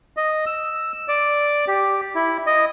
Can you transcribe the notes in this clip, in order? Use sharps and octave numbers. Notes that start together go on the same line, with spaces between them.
D#5
E6
D5
G4
E4
D#5